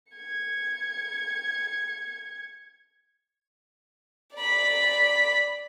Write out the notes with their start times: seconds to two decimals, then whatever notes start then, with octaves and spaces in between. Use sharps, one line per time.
0.13 G#6 C#7
4.35 D5 B5